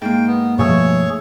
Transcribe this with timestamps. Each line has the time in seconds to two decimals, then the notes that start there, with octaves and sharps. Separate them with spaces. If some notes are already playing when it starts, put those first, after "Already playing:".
0.02 G#2 A#3 G5
0.27 B3
0.59 G2 B2 F3 A3 G#4 C#5 C#6 E6